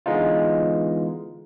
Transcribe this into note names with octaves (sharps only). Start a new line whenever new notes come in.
D3 E3 G#3 B3 D#4 F4